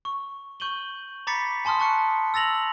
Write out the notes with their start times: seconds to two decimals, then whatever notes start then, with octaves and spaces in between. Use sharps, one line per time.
0.05 C#6
0.60 C#6 G6 D#7 F#7 G7
1.27 A#5 B5 D6 A6 B6 C#7
1.65 G#5 A5 C6 D#6 F6
1.80 A5 C#6 F#6 C#7
2.34 E6 A6 A#6 F7 F#7